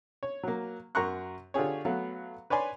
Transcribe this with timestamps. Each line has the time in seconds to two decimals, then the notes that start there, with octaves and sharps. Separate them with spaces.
0.23 C#5
0.43 F#3 A#3
0.95 F#2 A#4 A#5 C6 C#6 F#6
1.54 D3 F4 G4 G#4 C#5
1.85 F#3 A3 B3 F5
2.50 B4 C#5 D5 G#5 C6